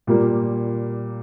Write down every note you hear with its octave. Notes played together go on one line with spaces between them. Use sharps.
A#2 G3 A#3